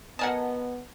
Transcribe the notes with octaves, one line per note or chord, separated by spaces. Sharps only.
F#3 B3 A#4 D#5 F#5 G#5 A5